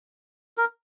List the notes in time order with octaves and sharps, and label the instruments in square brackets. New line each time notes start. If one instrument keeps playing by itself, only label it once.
[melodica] A#4